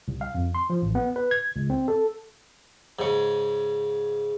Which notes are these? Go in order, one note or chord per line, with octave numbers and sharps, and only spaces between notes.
C2
F5
F2
C6
F3
A1
B3
B4
G#6
C#2
C4
A4
G#2 C#3